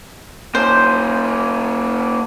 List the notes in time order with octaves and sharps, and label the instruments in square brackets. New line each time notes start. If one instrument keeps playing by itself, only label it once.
[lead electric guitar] A#3 C#4 [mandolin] C5